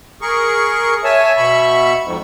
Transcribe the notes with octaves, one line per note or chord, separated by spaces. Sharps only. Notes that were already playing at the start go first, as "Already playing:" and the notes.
G#4 A#4 C#6
C#5 E5 G#5 A5
B2 B5 C#6
F2 G#2